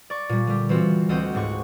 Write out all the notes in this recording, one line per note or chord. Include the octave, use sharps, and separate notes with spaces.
D5 C#6
A#2 G3
D3 G3
E3 C4 F4 F#4
D2 C4 D#5 F#5 G6
C#2 G#2 F#5 C#6